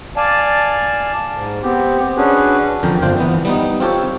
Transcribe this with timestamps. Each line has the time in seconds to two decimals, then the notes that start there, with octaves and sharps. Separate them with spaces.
0.16 D5 F5 G#5 A5
1.32 G#2
1.63 B3 C4 G4
2.17 C#4 D4 F#4 G#4 B4
2.83 F2 D3 A#4 G5
3.02 G1 D4 F4 C5 G5
3.19 E3 B3
3.45 G3 B3 D#4
3.80 C4 F4 G4 A4 C#5